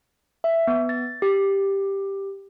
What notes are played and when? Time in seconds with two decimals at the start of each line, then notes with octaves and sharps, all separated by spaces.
0.44 E5
0.67 B3
0.89 A6
1.22 G4